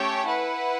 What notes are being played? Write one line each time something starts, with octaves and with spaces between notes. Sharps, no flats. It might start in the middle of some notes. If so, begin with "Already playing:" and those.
Already playing: A3 C#4 G4 C#5 G5
E4 B4 F#5